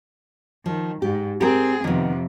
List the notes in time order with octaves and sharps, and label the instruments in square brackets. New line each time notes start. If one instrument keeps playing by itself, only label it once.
[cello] D#3 [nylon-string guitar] F3
[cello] G#2 [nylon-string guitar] G4
[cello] C4 G#4 [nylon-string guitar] G4 A#4
[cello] F2 C3 [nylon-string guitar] D#3 B3